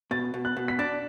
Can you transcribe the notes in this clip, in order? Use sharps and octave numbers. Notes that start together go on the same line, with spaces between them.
B2 A6
B2
F#6
B2
B6
D4 A6